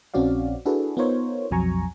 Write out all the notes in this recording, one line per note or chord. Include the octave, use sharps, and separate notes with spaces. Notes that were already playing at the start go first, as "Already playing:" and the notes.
A#1 C4 C#4 F#4 D5 F5
D4 E4 F#4 G#4 A4 B4
B3 D#4 F4 A#4 C5 C#5
B1 F2 F#3 G#5 A#5 C#6